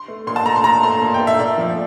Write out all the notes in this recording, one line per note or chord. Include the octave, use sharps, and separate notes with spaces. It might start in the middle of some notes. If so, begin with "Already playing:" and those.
Already playing: C6
A3
A#2 C6
A5
A3 A#5
C6
A#2 A#5
A3 C6
A#2
G5
A3
E5
A#2 D5
F3 A3